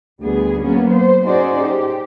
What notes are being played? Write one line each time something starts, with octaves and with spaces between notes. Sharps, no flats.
D2 G3 B3 G#4
F#3 A#3 B3 C#4
C5
C#4 D#4 F#4 G#4 C5 D5
G4